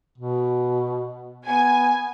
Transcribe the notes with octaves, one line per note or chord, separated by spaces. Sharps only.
B2
B3 G#5